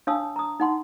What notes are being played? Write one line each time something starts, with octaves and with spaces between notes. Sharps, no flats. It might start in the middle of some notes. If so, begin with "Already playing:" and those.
D4 C#5 F5 A5 D#6 E6
A#5 D#6
D#4 F#5 C6